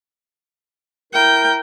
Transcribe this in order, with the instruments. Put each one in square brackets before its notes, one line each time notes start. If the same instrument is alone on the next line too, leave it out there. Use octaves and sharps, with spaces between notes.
[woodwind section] E4 A#4 [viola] G5